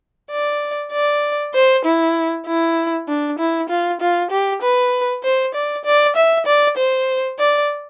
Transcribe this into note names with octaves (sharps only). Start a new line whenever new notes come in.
D5
D5
C5
E4
E4
D4
E4
F4
F4
G4
B4
C5
D5
D5
E5
D5
C5
D5